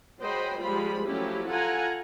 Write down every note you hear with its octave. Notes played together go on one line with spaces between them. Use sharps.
F#3 G#3 C5 D#5 G5 B5
F3 G3 G#3 F4 C5 B5
F3 F#3 A3 C#4 E4 G4
F4 A4 F#5 G#5 A#5